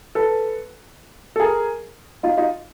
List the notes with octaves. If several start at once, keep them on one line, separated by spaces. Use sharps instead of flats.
A4 B4
A4
G#4 A#4
D#4 F4
D#4 F4